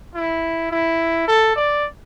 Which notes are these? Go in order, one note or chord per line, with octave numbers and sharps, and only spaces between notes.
E4
E4
A4
D5